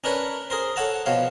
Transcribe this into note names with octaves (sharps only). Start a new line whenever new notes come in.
C#4 D4 A#4 B4 C#5
G#4 A#4 C5
A4 C#5 F#5 A5 A#5
B2 F3 C#5 F5